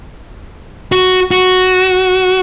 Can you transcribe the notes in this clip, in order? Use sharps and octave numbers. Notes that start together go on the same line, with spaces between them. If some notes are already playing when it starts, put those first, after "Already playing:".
F#4
F#4